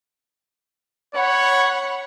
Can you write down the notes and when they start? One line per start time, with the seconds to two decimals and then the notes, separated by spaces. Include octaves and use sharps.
1.15 C#5 F#5 B5 F#6